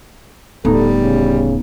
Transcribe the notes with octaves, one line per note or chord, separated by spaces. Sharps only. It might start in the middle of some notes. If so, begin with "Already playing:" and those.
D1 G3 B3 D#4 A4
C#3